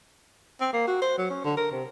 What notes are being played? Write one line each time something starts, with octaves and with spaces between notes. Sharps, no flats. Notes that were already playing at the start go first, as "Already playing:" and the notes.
C4
A#3
F#4
C5
F#3
C#4
D3
A#4
C3